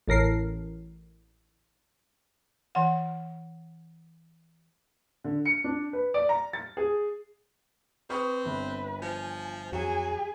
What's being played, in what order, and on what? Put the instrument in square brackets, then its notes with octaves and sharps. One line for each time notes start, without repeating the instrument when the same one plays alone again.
[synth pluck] A1 A2 A#4 C7
[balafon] E3 F#5
[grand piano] D3
C#7
D4
B4
D5
A#5
A6
G#4
[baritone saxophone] C4 [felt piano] B4 C#6 D#6
[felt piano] G1 [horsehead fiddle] B4
[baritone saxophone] F3 [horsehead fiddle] G#5
[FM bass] F2 [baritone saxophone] F#3 [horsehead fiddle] G#4 G#5